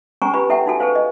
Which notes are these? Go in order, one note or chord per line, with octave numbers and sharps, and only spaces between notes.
C#4 G#4 C5 G#5 A#5 C#6
F4 G4 B4 B5
E4 A4 E5 F#5 G5
D#4 F#4 A4 G#5
G#4 A4 B4 C5 F5
D#5